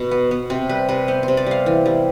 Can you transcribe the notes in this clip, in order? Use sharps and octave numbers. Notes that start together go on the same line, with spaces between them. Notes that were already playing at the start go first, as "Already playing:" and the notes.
Already playing: B2
B3
B3
C3 C4
G3 B4
C3 B4
B3 C5
C5
C3
D5
G3 F5
E3
G3